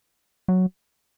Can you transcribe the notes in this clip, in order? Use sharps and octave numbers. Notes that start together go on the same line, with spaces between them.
F#3